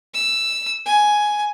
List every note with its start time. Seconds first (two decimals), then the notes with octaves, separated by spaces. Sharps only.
0.14 E6
0.86 G#5